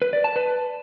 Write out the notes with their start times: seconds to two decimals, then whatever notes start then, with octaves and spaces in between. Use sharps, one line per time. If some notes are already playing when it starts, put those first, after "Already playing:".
0.02 B4
0.13 D5
0.24 A5
0.36 B4